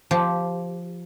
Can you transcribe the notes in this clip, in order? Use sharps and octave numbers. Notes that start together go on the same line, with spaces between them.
F3 G4